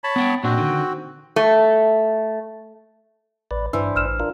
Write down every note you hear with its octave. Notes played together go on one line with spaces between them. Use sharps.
C#5 A5 B5
B3 F#5 G5
A#2 C4 D4 F#4
D3 D#3
A3
A1 B4 D5
G2 E3 D4 C5 E6
A1 E6 F6 E7
D4 F4 A#4